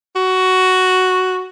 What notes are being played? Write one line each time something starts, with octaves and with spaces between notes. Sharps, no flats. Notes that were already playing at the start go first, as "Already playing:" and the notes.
F#4